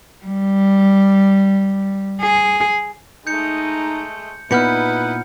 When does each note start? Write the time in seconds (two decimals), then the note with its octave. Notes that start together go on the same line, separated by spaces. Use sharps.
0.26 G3
2.22 G#4
3.27 G#3 A3 D#4 G6 C#7
4.51 A#2 B3 D#4 E4 B4 F6 G6 C#7